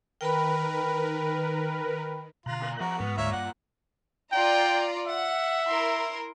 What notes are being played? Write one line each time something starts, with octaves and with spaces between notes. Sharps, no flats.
D#3 A#4 B4 G5 B5
B2 D3 F4 A#5 F#6
A#2 A#3
F3 C4 F#4 A#4
G#2 B3 F6
D2 A#3 F4 C#5 E5
G2 F#5
F4 D5 G5 A#5
E5 F#5
E4 A#4 C6